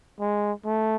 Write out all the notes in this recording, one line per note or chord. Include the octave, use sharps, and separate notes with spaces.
G#3
A3